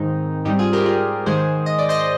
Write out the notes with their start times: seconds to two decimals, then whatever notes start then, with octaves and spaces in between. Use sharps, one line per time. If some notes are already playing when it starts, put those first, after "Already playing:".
Already playing: G#2 D#3 G#3 C4 D#4
0.45 G#2 G3 C4 D#4 G4
0.59 F4 G#4
0.73 G4 A#4
0.85 F4 G#4
1.26 G#2 D#3 G#3 G#4 C5
1.66 D#5
1.79 D5
1.89 C5 D#5